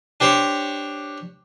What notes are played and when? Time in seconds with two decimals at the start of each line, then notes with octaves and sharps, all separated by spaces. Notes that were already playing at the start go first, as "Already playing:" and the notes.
0.20 D4 G4 C5 C#5